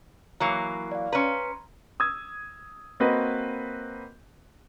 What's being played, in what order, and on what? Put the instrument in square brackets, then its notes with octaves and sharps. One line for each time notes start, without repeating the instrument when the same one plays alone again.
[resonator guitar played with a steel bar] E3 F#3 A#3 [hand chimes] A#5 C7
[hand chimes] D5 F5
[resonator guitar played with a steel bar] C#4 B4 [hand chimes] A#5 C6
[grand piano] D#6 E6 G#6
A#3 C4 F#4 B4 D#5